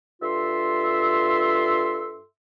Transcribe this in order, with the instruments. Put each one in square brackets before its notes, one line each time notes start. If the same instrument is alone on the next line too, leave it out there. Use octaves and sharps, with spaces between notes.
[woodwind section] G2 F4 A4 E5 C6